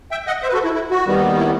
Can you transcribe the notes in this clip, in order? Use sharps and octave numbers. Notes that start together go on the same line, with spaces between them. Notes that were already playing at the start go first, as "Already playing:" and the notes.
E5 G5
D#5 F#5
C5 E5
B4
F#4 A4
E4
E4
F#4
D#2 D#3 G3 B3
E4